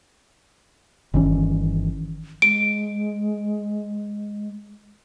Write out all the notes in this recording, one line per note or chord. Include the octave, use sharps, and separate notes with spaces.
G1 D#3 E3 C#4
G#3 D7